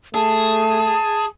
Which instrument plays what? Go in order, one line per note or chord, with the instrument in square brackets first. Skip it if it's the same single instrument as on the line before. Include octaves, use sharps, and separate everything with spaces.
[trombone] A3 [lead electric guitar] G#4 [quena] A5